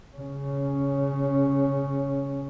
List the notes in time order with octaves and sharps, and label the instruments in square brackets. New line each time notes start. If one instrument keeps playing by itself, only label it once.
[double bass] C#3 C#4